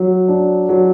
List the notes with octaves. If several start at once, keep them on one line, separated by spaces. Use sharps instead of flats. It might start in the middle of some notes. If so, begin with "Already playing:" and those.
Already playing: F#3
D4
F#3